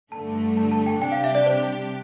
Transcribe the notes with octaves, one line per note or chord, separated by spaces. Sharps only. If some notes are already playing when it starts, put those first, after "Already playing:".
G2 D3 A3 A5
A5
A5
G5
C3 G3 D4 G4 G5
F5
E5
D5
C5